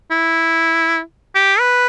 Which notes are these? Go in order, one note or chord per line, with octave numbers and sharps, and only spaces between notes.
E4
G4
B4